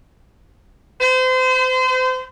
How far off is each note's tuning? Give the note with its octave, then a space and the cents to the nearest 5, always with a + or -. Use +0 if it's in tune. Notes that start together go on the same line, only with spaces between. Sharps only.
C5 -30